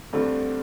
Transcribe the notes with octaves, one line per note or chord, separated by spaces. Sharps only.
G2 D3 A3 C4